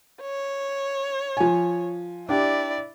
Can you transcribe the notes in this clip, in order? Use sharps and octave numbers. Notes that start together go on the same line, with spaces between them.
C#5
F3 G#5
D4 E4 G4 D5